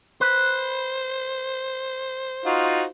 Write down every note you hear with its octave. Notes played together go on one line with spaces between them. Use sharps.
B4 C5
D#4 F4 F#4